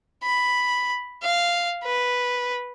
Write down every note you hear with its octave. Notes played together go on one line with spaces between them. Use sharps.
B5
F5
B4